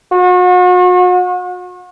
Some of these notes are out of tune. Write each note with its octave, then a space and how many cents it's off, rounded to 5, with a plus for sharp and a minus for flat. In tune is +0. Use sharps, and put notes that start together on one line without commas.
F#4 -40